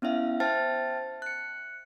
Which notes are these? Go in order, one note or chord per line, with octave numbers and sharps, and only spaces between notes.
B3 C#4 E4 E5 F5
C5 E5 G5 A5 F6 A6
F#6 C#7